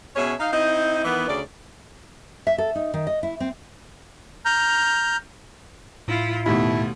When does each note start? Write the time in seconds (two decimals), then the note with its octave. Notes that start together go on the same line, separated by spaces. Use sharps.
0.16 B2 C#4 G#4 C#5 E5
0.40 D#4 F5
0.52 C4 D#4 E4 D#5
1.04 D#3 E3 B3
1.28 D2 C#3 D5
2.47 E5
2.58 A4
2.75 D#4
2.94 D#3
3.07 D#5
3.23 E4
3.40 C4
4.45 A#5 F6 G6
6.08 A2 E4 F4
6.46 D#2 B2 A3 E4